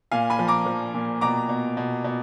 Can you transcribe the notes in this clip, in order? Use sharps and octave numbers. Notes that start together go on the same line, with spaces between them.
A#2 F5 G#5
G#5 B5
F3
A#5 D6
F3
A#2
B2 A#5 D6
B2
B2
B2